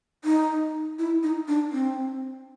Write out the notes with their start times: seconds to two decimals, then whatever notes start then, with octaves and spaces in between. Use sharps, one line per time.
0.25 D#4
0.99 E4
1.23 D#4
1.48 D4
1.73 C4